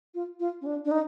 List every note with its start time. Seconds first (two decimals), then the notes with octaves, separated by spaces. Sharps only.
0.15 F4
0.40 F4
0.61 C#4
0.66 D4
0.85 D4
0.91 D#4